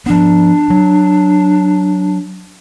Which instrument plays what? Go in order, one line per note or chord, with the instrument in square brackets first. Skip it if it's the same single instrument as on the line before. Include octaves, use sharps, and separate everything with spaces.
[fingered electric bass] F3 B3 [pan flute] D4
[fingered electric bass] F#3